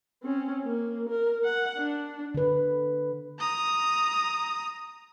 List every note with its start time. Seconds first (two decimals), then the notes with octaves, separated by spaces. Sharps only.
0.23 C4 C#4
0.63 A#3
1.09 A#4
1.44 F#5
1.78 D4
2.34 D3 B4
3.39 A#5 D#6